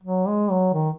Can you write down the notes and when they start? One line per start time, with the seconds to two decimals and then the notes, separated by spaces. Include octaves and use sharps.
0.03 F#3
0.28 G#3
0.51 F#3
0.74 D#3